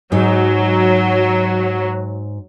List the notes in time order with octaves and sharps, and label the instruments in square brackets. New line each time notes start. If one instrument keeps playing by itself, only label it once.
[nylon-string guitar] G#2 D#4 [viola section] F#3